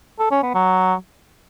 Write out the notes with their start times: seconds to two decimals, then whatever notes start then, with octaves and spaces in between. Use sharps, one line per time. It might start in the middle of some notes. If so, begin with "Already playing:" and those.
0.19 A4
0.31 C#4
0.43 B3
0.55 F#3